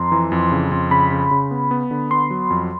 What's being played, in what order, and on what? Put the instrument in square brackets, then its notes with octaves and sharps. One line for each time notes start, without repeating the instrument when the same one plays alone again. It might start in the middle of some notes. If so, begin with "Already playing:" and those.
Already playing: [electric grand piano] F2 [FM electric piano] A#5 C6
[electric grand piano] E3
F2
C#3
F2
[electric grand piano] C#3 [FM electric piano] B5
[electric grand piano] C#3
C#3
B3
B3
D3
[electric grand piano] B3 [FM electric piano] C6
[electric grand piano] F#3
F2